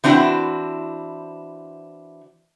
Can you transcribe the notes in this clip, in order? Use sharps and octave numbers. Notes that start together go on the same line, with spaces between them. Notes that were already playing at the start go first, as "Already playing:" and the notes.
E3 C4 D4 E4 F#4